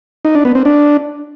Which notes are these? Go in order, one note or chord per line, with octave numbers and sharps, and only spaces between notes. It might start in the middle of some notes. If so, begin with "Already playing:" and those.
D#4
D4
B3
C4
D4